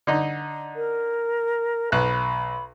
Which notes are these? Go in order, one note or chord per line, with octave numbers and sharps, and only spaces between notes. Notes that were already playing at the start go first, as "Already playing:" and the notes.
D3 D#4
A#4
B1 B5 F#6